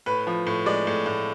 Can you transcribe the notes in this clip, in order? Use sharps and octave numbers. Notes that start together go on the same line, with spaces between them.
A2 B4
F3
A2
G#3 D5
A2
A2